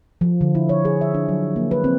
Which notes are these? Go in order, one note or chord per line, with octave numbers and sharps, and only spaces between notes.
F3
D3
E4
C#5
G#4
E5
D4
F#3
A#3
B4
C4